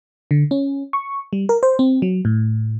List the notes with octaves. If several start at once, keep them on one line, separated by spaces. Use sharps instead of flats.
D3
C#4
C#6
G3
A#4
C5
C4
F#3
A2